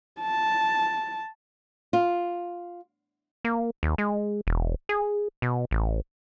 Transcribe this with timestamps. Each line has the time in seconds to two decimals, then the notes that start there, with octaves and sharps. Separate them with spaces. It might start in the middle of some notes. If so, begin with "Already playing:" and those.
0.21 A5
1.93 F4
3.45 A#3
3.83 D#2
3.98 G#3
4.47 E1
4.89 G#4
5.42 B2
5.71 A1